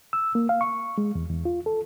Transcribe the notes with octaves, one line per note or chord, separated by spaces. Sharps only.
E6
A#3
F5
C#6
G#3
E2
E2
F4
A4